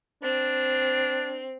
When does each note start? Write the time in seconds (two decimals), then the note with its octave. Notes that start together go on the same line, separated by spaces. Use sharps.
0.23 C4 D4